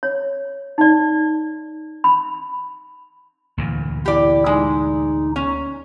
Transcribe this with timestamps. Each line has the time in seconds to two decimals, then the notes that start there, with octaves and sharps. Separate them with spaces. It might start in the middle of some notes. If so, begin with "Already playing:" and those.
0.03 C#5
0.78 D#4 D5
2.04 B5
3.58 D2 A#2 E3
4.06 E4 G4 D5
4.46 G#3 D#4
5.36 C#4